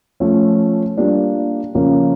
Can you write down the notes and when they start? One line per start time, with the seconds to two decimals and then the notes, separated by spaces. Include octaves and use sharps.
0.20 F3 A3 C#4
0.97 G3 A#3 D4 F4
1.75 C#3 F3 A#3 C#4